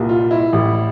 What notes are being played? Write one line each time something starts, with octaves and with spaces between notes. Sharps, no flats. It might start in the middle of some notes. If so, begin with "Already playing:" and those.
Already playing: C2 A#2 G3
F4
E4
A1 A2 G3